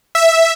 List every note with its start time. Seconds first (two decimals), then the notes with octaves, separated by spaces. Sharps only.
0.15 E5